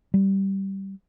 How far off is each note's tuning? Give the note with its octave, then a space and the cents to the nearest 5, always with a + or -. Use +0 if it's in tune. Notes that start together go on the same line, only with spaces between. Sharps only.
G3 -10